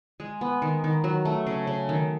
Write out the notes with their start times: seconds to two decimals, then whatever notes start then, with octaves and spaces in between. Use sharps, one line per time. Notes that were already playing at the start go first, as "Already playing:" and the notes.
0.20 G#3
0.41 B3
0.62 D#3
0.84 D#3
1.04 F#3
1.25 A3
1.47 C#3
1.67 C#3
1.89 D#3